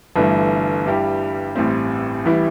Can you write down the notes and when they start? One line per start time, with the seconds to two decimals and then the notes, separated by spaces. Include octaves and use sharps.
0.16 G1 G2 E3 A3
0.86 G2 G3 E4 G4
1.56 A1 A2 G3 C4
2.25 A1 E3 G3 E4